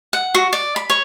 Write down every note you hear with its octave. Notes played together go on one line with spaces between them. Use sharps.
F#5
F#4
D5
B5
C#5